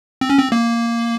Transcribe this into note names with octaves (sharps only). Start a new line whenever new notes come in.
C4
C#4
C4
A#3